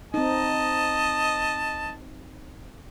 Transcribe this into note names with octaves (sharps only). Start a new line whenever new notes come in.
C4 D#4 D#5 A5